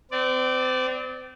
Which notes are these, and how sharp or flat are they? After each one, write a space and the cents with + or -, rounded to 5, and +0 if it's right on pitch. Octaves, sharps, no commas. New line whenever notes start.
C4 -35 D5 +0